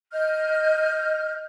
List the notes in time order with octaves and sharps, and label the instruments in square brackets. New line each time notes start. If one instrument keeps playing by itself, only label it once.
[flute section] D#5 F6 G6